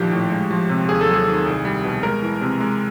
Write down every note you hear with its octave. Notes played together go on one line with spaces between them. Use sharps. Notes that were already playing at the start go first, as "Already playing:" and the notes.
Already playing: A#1 D#3 F3 G4
A2
G#3
F3
C3
D#2 G#4
A4
F#3
G#4
D#3
C2
G3
B2
G#3 A#4
E3
C3
G#3